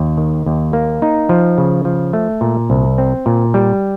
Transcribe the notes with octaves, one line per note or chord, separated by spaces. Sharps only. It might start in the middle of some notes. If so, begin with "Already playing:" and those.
Already playing: D#2
D#3
D#2
A#3
D#4
F3
C#3
F3
A3
A#2
C2
C4
A#2
G3